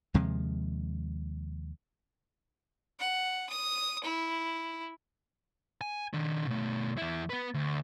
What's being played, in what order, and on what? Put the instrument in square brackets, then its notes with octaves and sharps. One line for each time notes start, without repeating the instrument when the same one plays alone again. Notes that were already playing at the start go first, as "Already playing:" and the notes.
[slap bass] D#2 C3 F3 G#3
[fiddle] F#5
D#6
E4
[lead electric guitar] G#5
D#3 D4
B2 A3
E2 E4
B3 B4
D2